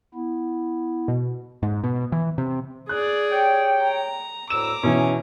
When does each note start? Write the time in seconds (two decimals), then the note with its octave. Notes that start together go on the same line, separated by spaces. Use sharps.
0.14 B3 E4
1.08 B2
1.63 G#2
1.84 B2
2.12 E3
2.38 C3
2.89 G#4 D5 F#6
3.32 G4 C#5 G5
3.83 A#5
4.50 D2 A2 A#5 D6 E6 E7
4.83 B2 E3 C#4